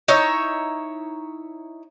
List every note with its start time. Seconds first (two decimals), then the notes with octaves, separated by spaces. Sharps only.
0.08 D#4 E4 C#5 E5